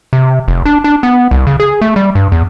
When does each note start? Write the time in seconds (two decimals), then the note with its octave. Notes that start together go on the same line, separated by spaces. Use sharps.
0.13 C3
0.48 F1
0.65 D4
0.84 D4
1.03 B3
1.31 C2
1.47 C#3
1.60 G#4
1.81 A3
1.96 G3
2.15 G2
2.32 E2